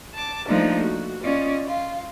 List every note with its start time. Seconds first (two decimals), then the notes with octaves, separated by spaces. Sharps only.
0.14 A5 D6
0.46 F3 A3 A#3 D4 D#4 F4
0.80 F#4
1.23 C#4 F4 D5 D#5
1.66 F4